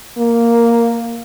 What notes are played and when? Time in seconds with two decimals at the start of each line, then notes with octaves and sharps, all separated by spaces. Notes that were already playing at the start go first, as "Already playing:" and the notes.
0.18 A#3